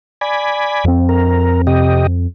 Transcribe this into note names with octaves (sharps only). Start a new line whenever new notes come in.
D5 G#5 B5
F2 C4
A#4
C3 G4 D#5